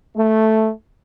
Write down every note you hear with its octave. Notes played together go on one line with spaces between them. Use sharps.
A3